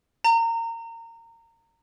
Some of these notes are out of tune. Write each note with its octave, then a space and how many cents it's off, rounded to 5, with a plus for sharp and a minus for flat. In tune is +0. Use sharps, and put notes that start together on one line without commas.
A#5 -25